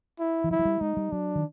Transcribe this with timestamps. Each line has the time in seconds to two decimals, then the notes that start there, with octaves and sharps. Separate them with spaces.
0.19 E4
0.44 E3
0.51 F3 E4
0.59 F#3
0.65 G3
0.81 G#3 D#4
0.97 G3
1.12 F#3 D4
1.35 D#3